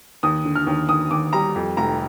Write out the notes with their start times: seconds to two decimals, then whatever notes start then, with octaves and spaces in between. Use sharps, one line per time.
0.23 D#2 D#6
0.45 D3
0.55 F6
0.67 D#2
0.89 D#2 D#6
1.11 D#2 D6
1.33 G3 A#5
1.56 F2
1.77 F1 A#5